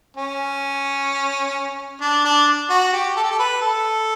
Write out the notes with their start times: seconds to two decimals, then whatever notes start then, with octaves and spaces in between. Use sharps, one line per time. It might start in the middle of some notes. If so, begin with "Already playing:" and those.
0.17 C#4
2.01 D4
2.25 D4
2.70 F#4
2.93 G4
3.16 A4
3.24 G4
3.31 A4
3.39 B4
3.62 A4